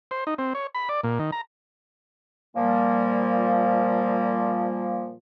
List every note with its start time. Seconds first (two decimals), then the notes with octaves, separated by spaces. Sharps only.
0.11 C5
0.27 D#4
0.38 C4
0.55 C#5
0.75 B5
0.89 D5
1.03 A#2
1.19 D#3
1.32 A#5
2.55 A#2 F3 G3 A#3